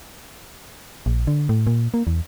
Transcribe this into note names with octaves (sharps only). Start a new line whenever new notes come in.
A#1
D3
A2
A#2
A#3
E2